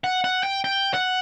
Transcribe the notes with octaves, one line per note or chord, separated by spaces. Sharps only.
F#5
F#5
G5
G5
F#5